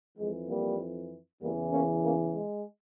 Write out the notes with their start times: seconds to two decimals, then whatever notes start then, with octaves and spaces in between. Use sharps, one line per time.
0.17 F2 E3 G#3
0.47 G3 A#3
1.40 E2 C#3 E3 G3 A#3
1.71 A#3 C#4
2.02 A#3 C#4
2.33 G#3